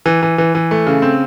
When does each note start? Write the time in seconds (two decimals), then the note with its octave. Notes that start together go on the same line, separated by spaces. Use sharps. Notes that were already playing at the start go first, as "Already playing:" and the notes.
0.06 E3
0.23 E3
0.38 E3
0.55 E3
0.71 A3
0.87 C#3
1.02 C4